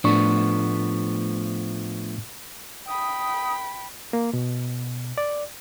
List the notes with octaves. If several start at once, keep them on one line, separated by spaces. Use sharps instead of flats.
A2 F3 A3 B3 D4 C#6
G5 B5 D#6
A#3
B2
D5